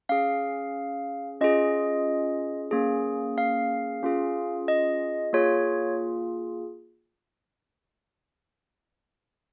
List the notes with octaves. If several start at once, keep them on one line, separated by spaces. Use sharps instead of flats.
C#4 G#4 F5
C#4 F4 G#4 D#5
A#3 C#4 G#4
F5
C#4 F4 G#4
D#5
A#3 F4 G#4 C#5